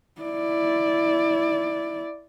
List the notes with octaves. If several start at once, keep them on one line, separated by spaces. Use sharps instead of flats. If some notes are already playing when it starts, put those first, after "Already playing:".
E4 D5